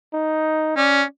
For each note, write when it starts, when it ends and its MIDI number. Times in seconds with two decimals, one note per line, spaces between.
0.13 0.77 63
0.77 1.03 61
0.77 1.05 74